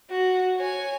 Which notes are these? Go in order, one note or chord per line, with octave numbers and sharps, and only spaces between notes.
F#4
C#5 G#5